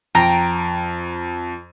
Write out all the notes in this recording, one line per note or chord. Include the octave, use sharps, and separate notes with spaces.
F2 G5 A#5